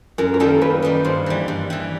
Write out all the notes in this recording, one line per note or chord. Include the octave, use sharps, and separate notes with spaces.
F#2 A#4
A#4
D#3 G3 A#3 A4
F#2 B4
D#3 G3 A#3
G2 C5
E3 G3
G2
E3 G3